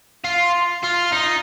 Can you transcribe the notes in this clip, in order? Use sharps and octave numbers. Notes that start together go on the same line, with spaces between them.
F4
F4
D#4